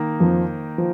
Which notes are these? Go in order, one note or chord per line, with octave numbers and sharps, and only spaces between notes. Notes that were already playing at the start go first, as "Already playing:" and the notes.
Already playing: D#3 A#3 D#4
F2 F3
F3